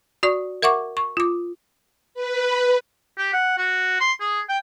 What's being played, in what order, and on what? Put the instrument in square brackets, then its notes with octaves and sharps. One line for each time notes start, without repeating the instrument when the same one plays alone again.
[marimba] F#4 D5 C#6
A#4 E5 F#5 C#6 D6
C#6
F4 D6
[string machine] B4
[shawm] G4
F#5
F#4
C6
G#4
G5